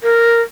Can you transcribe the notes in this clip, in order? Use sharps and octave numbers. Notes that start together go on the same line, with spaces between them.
A#4